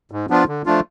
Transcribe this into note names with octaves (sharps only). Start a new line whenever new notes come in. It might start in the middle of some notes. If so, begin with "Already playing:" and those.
G#2
F3 B3 D4 F4
D3
F3 A3 D4 F4